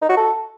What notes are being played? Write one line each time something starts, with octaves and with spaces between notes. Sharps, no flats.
D#4
F#4
A4